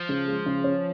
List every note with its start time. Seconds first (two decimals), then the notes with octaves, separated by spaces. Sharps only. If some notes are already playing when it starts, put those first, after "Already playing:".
Already playing: F3
0.09 C#3
0.28 G#3
0.46 C#3
0.64 C#4